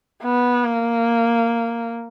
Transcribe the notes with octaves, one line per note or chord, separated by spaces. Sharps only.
B3
A#3